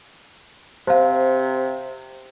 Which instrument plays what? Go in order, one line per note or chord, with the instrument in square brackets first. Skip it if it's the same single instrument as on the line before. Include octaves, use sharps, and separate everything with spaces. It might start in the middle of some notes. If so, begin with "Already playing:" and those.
[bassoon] C3 [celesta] C5 F5